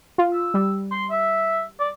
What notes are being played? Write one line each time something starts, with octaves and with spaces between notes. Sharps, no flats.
F4
E6
G3
C6
E5
D5